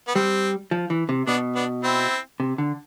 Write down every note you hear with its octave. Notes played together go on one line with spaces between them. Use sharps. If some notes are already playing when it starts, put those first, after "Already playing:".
B3
G3 C4
F3
E3
C3
B2 B3 D4
B3 D4
C4 E4
C3
D3